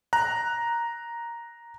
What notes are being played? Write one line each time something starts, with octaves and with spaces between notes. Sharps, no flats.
A#5 F#6